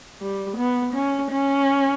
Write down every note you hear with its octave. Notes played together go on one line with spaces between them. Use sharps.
G3
B3
C#4
C#4